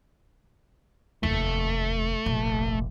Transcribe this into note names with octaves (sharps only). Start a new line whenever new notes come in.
F1 D#2 A3
F1 A#1